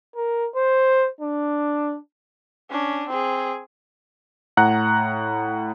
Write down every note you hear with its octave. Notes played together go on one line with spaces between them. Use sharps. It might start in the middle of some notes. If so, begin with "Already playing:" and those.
A#4
C5
D4
C#4 D4
C4 G#4
A2 F#5 A#5 F#6